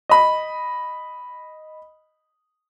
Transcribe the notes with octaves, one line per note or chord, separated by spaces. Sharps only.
D#5 B5